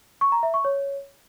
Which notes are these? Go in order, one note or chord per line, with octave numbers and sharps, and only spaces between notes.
C#6
A#5
E5
C#6
C#5